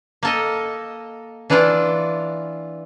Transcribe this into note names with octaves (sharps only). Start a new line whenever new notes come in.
A#3 A4 D#5
E3 D4 E4 F4 D5